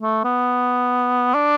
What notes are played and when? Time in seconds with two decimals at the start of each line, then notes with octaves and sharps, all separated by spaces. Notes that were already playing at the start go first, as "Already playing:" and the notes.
0.02 A3
0.24 B3
1.34 D4